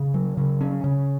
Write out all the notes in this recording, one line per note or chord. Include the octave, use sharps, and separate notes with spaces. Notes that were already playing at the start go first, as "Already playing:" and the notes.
Already playing: C#3
F#3
C#3
C#4
C#3